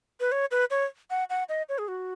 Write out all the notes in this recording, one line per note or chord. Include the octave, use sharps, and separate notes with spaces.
B4
C#5
B4
C#5
F#5
F#5
D#5
C#5
G#4
F#4